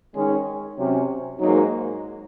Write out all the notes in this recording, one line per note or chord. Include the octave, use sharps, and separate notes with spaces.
D#3 G#3 C#4
C3 F#3 C#4
G#2 F#3 A#3 D#4